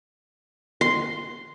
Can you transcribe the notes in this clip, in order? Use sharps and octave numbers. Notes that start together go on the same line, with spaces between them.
C6